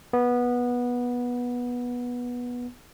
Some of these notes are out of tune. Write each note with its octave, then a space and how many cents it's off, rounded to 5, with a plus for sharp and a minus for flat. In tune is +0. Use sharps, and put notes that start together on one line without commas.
B3 -15